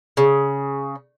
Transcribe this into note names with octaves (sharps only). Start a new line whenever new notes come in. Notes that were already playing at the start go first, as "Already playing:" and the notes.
C#3